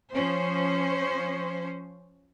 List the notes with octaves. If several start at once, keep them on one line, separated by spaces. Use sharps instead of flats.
F3 C#4 C5